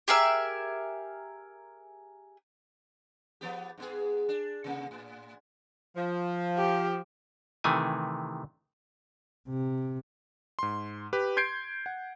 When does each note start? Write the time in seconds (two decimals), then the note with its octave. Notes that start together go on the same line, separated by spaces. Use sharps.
0.08 G4 G#4 A#4 E5
3.41 F3 B3 G4
3.78 G#2 B3 G#4
4.29 D4
4.64 C3 A#3
4.91 A2
5.96 F3
6.57 G4
7.64 C3 D#3 E3 A3 G#5
9.49 C3
10.59 G#2 C6
11.13 G4 B4
11.37 C6 G6 G#6 C7 D7
11.86 F#5